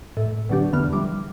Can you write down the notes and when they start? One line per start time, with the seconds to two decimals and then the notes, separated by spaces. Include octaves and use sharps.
0.17 A2
0.49 B2 D3 F#3 D4 G4
0.73 E2 D3 E3 B3 F6
0.93 E3 F3 G3 D6